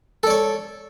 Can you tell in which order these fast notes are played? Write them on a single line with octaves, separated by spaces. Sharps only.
A4 D5 C#5